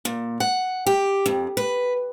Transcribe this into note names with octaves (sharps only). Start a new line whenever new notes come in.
A#2
F#5
G4
F2
B4